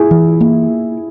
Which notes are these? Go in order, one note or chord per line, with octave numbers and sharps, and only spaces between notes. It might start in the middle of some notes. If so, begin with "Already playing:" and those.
Already playing: E4 G#4
E3
A#3